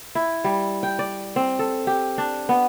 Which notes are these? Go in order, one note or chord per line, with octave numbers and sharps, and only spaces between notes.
E4
G3
G5
D5
C4
A4
G4
D4
B3